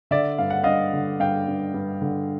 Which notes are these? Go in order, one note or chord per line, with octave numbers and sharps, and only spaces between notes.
D3 D5 E5
G2 F5
F#5
G2 D#5 F5
D3
G2 F5 G5
G2
G2
D3